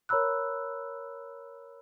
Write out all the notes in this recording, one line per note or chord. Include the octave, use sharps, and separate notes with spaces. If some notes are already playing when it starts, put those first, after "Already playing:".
A#4 C#5 A#5 B5 E6 F#6